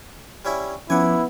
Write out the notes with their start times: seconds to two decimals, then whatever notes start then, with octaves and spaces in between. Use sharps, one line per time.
0.45 G3 C#4 E4
0.90 F3 B3 C#4 E4 F#5 G#5 D6